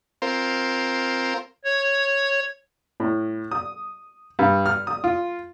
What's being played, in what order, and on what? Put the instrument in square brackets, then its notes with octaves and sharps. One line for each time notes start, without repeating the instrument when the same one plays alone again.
[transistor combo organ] C4 F4 A#4 C5
[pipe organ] C#5
[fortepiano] A2
D#6
G2
F6
D#6
F4